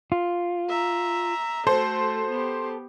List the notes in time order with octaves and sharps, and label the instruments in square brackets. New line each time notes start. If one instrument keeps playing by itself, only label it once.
[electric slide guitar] F4
[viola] E5 A#5
[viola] A3 F#4 [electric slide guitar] A4 [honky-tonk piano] C5
[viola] B3 G4